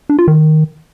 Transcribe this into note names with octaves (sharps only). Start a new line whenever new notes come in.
D4
F4
D#3